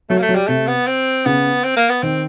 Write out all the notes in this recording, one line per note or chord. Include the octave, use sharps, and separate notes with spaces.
F#3 A3
A#3
A3
F#3
G3
C3 A3
B3
C4
C#3 B3
C4
A#3
B3
D#3 C4